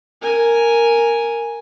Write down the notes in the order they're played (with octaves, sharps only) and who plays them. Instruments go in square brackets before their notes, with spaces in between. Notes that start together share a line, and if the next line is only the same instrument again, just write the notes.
[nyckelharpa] A#4 G#5